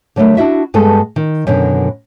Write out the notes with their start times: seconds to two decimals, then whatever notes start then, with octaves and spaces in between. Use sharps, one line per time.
0.16 D3 F#3 G3 A3 A#4
0.37 D4 E4 F#4 E5
0.74 G2 G#3 B3 A4 A5
1.16 D#3
1.47 F#2 B2 D3 D#3